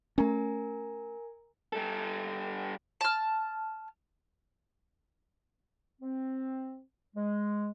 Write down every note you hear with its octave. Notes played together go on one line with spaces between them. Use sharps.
A3 C#4 A#4 G#5 A#5
G3 A4
A5 F6
C4
G#3